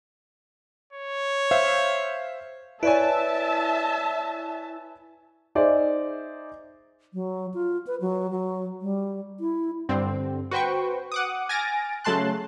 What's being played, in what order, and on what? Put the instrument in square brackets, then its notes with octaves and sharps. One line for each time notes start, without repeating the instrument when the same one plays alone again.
[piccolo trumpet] C#5
[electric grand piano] C5 E5 F5
[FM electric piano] E4 [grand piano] B4 C#5 G#5 [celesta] D5 D7 [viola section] E5 A5
[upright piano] D#4 G#4 C5 D5 E5
[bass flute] F#3
F4
B4
F#3
F#3
G3
E4
[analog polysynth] G2 D3 C4
F#4 B4 C5 G5 C#6
F#5 D6 D#6
G#5 F6 A6 A#6 D7
C#3 F#3 A3 A5 C6 F#6